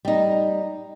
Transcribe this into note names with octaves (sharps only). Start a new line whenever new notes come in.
G3 D#4